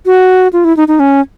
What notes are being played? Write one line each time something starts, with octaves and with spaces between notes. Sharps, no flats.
F#4
F4
E4
D#4
D#4
C#4